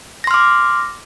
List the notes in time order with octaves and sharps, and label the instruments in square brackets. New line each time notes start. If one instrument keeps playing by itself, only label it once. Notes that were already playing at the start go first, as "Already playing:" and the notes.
[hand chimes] A#6
C6
F6
D6